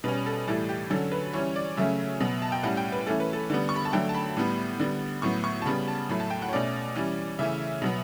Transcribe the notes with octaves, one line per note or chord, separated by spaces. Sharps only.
B2 G3 C#4 B4
A4
A2 E3 G3 A4
G4
D3 F#3 C#4 A4
B4
E3 G3 C#4 C#5
D5
C#3 F#3 A3 C#4 E5
B2 F#3 B3
A5
G5
A2 G3 C#4 F#5
G5
B4
E3 A3 C#4 A4
B4
A4
D3 G3 B3
C#6
B5
A5
D3 F#3 A3 G5
A5
B5
A2 G3 B3
D3 G3 B3
A2 F#3 B3 C#6
C#6
A5
C#3 G3 B3 B5
A5
A2 F#3 A3 B5
A5
G5
F#5
C#5
B2 A3 C#4 D5
E3 G3 C#4
C#3 E3 A3 C#4 E5
B2 F#3 B3